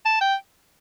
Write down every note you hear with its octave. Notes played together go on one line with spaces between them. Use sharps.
A5
G5